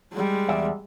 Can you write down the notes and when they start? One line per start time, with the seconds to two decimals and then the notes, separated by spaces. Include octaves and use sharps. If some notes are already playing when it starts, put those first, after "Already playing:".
0.13 G3 G#3
0.49 E2 D5 E5